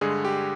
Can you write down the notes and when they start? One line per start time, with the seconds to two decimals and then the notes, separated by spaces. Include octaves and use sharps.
0.01 G2 D3 G#3 G#4
0.25 G4